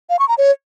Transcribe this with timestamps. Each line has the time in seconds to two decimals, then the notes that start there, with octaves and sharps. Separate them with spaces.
0.10 F5
0.19 C#6
0.29 A#5
0.38 C#5